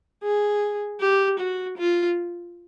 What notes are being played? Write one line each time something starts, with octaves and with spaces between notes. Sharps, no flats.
G#4
G4
F#4
F4